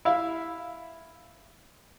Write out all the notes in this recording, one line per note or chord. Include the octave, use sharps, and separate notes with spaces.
E4 E5 F5